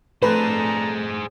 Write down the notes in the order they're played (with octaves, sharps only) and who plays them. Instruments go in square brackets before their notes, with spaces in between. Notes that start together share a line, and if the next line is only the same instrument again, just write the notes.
[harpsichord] F2 A3 [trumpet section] D4 A5 A#5 [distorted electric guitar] G#4 C5 [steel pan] B4